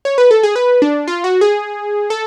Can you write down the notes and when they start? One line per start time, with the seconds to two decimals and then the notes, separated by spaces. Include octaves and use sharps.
0.05 C#5
0.18 B4
0.31 A4
0.43 G#4
0.56 B4
0.82 D4
1.08 F4
1.24 F#4
1.41 G#4
2.10 A4